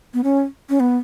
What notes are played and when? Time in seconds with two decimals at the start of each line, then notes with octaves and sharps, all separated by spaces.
0.14 B3
0.24 C#4
0.70 C#4
0.80 B3